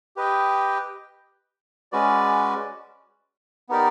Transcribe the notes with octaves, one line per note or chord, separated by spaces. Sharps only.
G4 B4 D#5 G5
G#3 C#4 F#4 B4 D5
B3 D#4 G4 A#4 D5